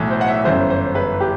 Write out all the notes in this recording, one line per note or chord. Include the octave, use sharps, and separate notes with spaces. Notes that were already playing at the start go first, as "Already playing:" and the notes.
Already playing: B1 A2 E3
C5
F#5
E5
G1 F#2 E3 C5
C5
B4
G4